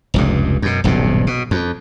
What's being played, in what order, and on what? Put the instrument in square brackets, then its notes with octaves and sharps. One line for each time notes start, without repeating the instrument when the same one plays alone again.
[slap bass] F1 C#2 G2
F#2 B2
D#1 B1 G2 C3
B2
F2